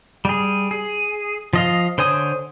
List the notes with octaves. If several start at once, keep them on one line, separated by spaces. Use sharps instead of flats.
G3 G#4
G#4
F3 D#5 F5
D3 C5 C#5 G#5 D#6